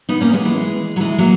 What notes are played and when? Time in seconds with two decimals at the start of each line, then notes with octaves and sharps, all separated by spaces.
0.09 B3 D#4
0.21 A#3 C#4
0.33 G#3 B3
0.45 E3 G#3
0.96 F#3
1.00 E3 G#3
1.18 F#3 A#3